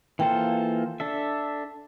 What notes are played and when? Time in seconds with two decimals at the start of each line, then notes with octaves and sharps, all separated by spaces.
0.19 E3 A#3 F4 A4 C5 G5
1.00 D4 A4 E5